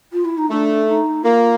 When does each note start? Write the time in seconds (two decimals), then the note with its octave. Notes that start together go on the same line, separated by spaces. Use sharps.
0.13 F4
0.25 E4
0.38 D#4
0.50 A3 D4
0.86 D#4
1.23 A#3 F4